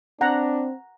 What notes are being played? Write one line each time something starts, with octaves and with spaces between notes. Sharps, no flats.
C4 D4 F#5 A#5